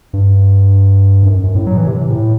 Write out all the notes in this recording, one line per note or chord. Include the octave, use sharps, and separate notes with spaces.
G2
F#2
F#2
A2
F#3
E3
C3
A2